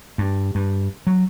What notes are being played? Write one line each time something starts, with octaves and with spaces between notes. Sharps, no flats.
G2
G2
F#3